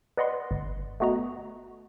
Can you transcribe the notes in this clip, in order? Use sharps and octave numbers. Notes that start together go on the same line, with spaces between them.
B4 D5 D#5 F#5 B5 C6
G1
A3 B3 F#4 D#5 A#5